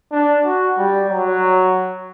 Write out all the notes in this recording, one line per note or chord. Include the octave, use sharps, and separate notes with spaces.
D4
F#4
G3
F#3